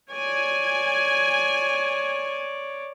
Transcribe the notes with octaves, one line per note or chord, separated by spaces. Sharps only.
C#5 D5 G#5